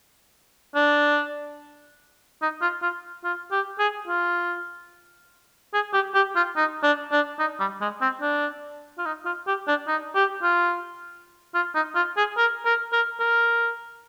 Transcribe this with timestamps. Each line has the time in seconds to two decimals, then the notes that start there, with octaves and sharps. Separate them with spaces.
0.76 D4
2.42 D#4
2.62 F4
2.82 F4
3.24 F4
3.52 G4
3.79 G#4
4.08 F4
5.74 G#4
5.94 G4
6.15 G4
6.36 F4
6.56 D#4
6.83 D4
7.12 D4
7.39 D#4
7.60 G3
7.81 G#3
8.02 C4
8.22 D4
8.98 F4
9.06 D#4
9.25 F4
9.47 G4
9.68 D4
9.88 D#4
10.16 G4
10.43 F4
11.55 F4
11.75 D#4
11.95 F4
12.17 G#4
12.37 A#4
12.65 A#4
12.93 A#4
13.20 A#4